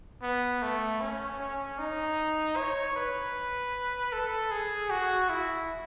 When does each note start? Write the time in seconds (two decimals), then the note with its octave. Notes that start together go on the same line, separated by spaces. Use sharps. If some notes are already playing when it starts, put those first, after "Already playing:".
0.22 B3
0.62 A3
1.01 C#4
1.40 C#4
1.78 D#4
2.57 C#5
2.96 B4
4.12 A4
4.51 G#4
4.90 F#4
5.29 E4